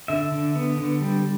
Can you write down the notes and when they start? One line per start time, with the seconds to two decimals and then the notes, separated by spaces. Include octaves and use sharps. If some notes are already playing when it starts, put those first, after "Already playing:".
0.08 D3 E5
0.32 D3
0.55 B3
0.78 D3
1.01 G3